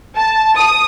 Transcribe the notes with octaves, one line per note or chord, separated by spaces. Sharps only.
A5
D#6